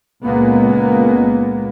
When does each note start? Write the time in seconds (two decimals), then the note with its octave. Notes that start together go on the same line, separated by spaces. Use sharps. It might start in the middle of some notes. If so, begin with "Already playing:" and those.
0.25 C#2 A#2 G#3 A#3 B3